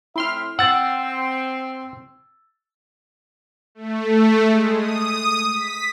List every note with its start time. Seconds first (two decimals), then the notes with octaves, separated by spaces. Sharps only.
0.16 A2 C4 E4 E5 C6 F6
0.59 C4 F#5 E6 A6
3.75 A3
4.46 G#3
4.74 D#6
5.51 B6